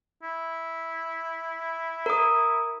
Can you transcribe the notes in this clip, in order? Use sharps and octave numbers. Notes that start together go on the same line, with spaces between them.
E4
A#4 D#6